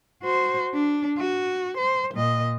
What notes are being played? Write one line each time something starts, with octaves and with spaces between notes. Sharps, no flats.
F#4 C5
D4
F#4
C5
A#2 D#5